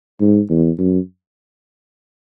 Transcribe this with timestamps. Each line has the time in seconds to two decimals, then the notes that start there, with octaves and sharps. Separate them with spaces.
0.20 G#2
0.50 E2
0.78 F#2